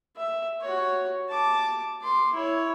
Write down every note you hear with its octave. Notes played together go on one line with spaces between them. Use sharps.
E5
F#4 C#5
A5 D6
C6 D6
E4 C#5